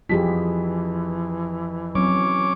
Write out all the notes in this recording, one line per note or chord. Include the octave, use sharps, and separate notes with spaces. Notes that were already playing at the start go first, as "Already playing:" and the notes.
F2 E3 F4 G4 G#4 B6
F#3 C4 C#4 D6